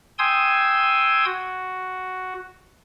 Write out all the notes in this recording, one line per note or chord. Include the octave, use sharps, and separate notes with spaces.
G5 G#5 C6 D#6 E6 G#6
F#4